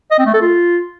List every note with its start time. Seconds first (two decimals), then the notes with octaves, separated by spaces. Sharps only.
0.11 D#5
0.18 C4
0.26 A3
0.34 A4
0.41 F4